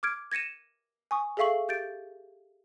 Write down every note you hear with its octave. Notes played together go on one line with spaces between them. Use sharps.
D6 F6 G#6 D7
G#6 A#6 C#7 D#7 E7
G#5 C#6 D#6
G#4 A4 E5 F5 C#6 F#7
G4 G6 A6 D7